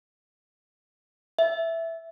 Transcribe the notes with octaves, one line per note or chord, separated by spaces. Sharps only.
E5